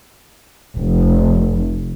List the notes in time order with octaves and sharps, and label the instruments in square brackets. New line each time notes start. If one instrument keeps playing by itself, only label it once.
[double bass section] F1